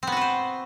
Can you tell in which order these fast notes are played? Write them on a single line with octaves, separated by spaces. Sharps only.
C4 B3 F#4 B4 C5